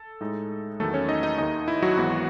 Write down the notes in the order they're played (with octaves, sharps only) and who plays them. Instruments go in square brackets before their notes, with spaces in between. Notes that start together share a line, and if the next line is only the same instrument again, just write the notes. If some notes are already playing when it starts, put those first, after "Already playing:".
Already playing: [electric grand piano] A4
A2 G#3 D#4
E2 D#3 F#3 A3 A4
C#4 C#5
D#4 D#5
D#4 D#5
D#2 D#3 A3 D#4 D#5
E4
F#3 F#4
G#1 G#2 E3 B3